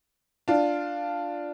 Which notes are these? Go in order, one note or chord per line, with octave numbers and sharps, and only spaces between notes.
D4 F4